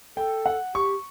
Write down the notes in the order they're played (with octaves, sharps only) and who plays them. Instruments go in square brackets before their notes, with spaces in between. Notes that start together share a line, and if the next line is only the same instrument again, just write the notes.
[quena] A4 [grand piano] G5
[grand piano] F#5
[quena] G4 [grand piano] C#6